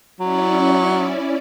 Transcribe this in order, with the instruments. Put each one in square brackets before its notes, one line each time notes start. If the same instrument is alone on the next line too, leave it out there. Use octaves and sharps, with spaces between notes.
[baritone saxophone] F#3 [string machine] C#4 E4 D5